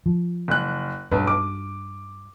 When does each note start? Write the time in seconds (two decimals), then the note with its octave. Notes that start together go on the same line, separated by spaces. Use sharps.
0.06 F3
0.48 F#1 F#6
1.11 B1 G2 B3
1.27 D6